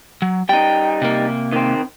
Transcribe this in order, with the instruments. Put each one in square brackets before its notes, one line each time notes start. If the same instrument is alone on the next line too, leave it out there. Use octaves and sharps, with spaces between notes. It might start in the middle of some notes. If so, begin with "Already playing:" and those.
[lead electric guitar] F#3
[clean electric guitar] G3 D#4 [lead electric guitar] G5
[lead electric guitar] C3 A#3
[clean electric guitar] D#3 C4